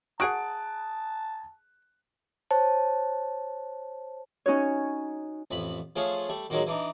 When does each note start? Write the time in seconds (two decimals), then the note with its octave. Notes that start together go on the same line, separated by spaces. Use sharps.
0.20 F#4 G#4 F#5 A5 D#6 F#6 D7
2.51 C5 C#5 A5
4.46 C#4 D#4 F#4 C#5
5.51 A1 F2 B5
5.96 F3 A3 C#4 F4 G#4
6.29 G3 A3
6.50 A#2 D#3 F#3 G#3
6.67 E3 D4 D#4